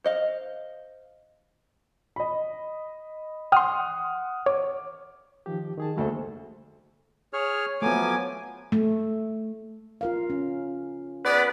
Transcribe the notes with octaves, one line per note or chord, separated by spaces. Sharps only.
C5 D#5 F5
D#5 B5
F#5 G5 C6 D#6 F6
C#5 D6
D#3 F3 G4
D#3 G#4 A5
F#1 D2 A3 A4 C5
G#4 C#5 F6
F3 F#3 A3 B3 G#5 D6
A3
F4 A#4 F5
C#4
B3 G#4 B4 D5 F#5 B5